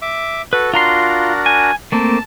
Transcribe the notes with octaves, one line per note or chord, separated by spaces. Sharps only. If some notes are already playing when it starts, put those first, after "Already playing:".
E5 D6
F#4 A4 B4
D4 F4 F#4 A#4 A#5 C6
G#5
A3 A#3 C4 A5